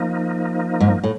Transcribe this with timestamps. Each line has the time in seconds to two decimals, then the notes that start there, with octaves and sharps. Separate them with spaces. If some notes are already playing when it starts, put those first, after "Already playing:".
Already playing: F3 A#3 D#4
0.80 G#2
1.04 A2